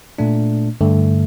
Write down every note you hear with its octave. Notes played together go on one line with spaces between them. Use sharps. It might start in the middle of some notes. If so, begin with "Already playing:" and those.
A#2 A3 D4
G2 D3 A3